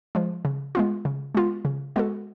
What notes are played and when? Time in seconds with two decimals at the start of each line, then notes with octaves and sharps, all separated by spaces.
0.15 F3 G#3
0.45 C#3
0.75 G#3 B3 F4
1.05 C#3
1.35 G#3 B3 F4
1.65 C#3
1.96 G#3 B3 F#4 A4